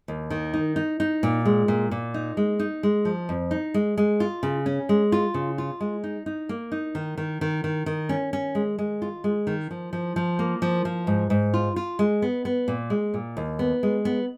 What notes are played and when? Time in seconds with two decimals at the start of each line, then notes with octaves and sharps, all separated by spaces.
0.08 D#2
0.30 D#3
0.54 D#4
0.76 D#4
1.00 D#4
1.23 A#2
1.45 G#3
1.68 A#2
1.91 A#2
2.14 D#4
2.37 G#3
2.59 D#4
2.83 G#3
3.05 F3
3.29 F2
3.51 D#4
3.74 G#3
3.97 G#3
4.20 F4
4.43 C#3
4.66 C#4
4.89 G#3
5.12 F4
5.34 C#3
5.58 F4
5.81 G#3
6.04 D#4
6.26 D#4
6.49 A#3
6.72 D#4
6.95 D#3
7.17 D#3
7.41 D#3
7.64 D#3
7.86 D#3
8.09 C#4
8.33 C#4
8.55 G#3
8.79 G#3
9.02 F4
9.24 G#3
9.47 D#3
9.71 F3
9.93 F3
10.16 F3
10.39 A#3
10.62 F3
10.85 F3
11.07 G#2
11.30 G#2
11.54 F4
11.76 F4
11.99 G#3
12.22 B3
12.45 B3
12.68 A#2
12.90 G#3
13.14 A#2
13.37 D#2
13.59 B3
13.83 G#3
14.05 B3